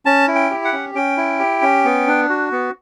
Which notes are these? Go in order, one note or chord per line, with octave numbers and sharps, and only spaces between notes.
C#4 A5
E4
G5
G4
F#5
C#4
C#4 G5
E4
G4
C#4
B3
D4
F#4
B3